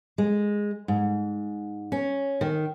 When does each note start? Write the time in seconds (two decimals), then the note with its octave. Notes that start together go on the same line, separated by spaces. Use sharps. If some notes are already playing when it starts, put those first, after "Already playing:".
0.18 G#3
0.88 G#2
1.92 C#4
2.41 D#3